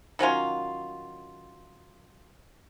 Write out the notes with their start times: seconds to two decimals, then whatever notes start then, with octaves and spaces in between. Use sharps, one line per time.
0.19 D#3 F#3 C#4 F4